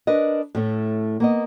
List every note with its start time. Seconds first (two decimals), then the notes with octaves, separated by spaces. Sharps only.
0.07 D4 A#4 B4 D#5
0.55 A2 A3 C#4
1.20 A#3 B3 D#5